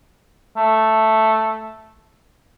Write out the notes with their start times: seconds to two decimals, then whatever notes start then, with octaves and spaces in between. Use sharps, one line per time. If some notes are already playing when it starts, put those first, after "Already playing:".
0.57 A3